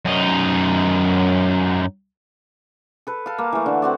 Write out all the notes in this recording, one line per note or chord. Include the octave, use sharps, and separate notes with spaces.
F#2 D#4
A4 B4
A4 F5
A#3
E3 A3
D3
C4 F#4 D5